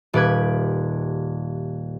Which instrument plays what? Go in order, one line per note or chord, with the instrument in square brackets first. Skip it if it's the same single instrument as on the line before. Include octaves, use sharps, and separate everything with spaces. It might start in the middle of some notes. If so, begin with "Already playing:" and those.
[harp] D#1 G4 B4 G#6